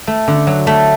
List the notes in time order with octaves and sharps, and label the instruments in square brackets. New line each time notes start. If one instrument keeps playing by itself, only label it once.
[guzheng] A3
D3
F#3
A3